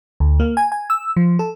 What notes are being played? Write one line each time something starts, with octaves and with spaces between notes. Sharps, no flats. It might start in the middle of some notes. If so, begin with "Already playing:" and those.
D2
A#3
G#5
G#5
E6
F3
A4